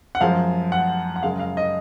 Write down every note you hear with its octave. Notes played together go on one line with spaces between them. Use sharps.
F#5
F#2 F3 G#3 F5
F#5
F#5
F#2 C#3 G#3 F5
F5
D#5